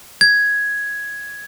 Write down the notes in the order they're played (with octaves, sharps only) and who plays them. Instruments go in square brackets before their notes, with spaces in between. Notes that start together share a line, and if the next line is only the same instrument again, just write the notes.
[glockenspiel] G#6